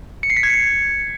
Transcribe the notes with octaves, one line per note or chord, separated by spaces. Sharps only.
C#7
C7
B6
G#6
C#7